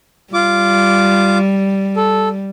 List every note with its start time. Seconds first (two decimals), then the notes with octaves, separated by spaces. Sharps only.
0.34 G3 F4 D6
1.96 A4